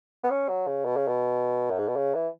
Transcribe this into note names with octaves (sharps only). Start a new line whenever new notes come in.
B3
C#4
F#3
C#3
B2
C#3
B2
F#2
G#2
B2
C#3
E3